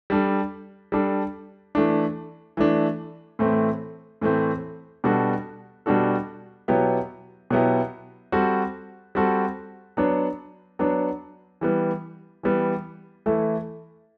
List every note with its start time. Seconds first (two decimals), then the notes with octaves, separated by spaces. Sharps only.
0.10 G3 D4 A4
0.92 G3 D4 A4
1.75 E3 A3 D4
2.57 E3 A3 D4
3.39 A2 E3 A3 C4
4.21 A2 E3 A3 C4
5.04 B2 G3 D4 F#4 A4
5.86 B2 G3 D4 F#4 A4
6.68 B2 F#3 B3 E4 G4
7.50 B2 F#3 B3 E4 G4
8.32 G3 C4 F#4 A4
9.15 G3 C4 F#4 A4
9.97 F#3 B3 D4
10.79 F#3 B3 D4
11.61 E3 G3 B3
12.43 E3 G3 B3
13.26 E3 A3 E4 A4